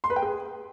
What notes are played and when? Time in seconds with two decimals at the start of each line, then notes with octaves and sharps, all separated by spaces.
0.04 C6
0.10 B4
0.16 G5
0.22 G#4